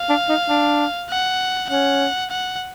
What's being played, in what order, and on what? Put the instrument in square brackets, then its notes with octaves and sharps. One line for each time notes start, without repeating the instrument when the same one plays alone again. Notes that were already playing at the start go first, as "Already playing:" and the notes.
Already playing: [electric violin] F5
[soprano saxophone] D4
D#4
D4
[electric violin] F#5
[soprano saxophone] C#4 [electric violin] F#5
[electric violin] F#5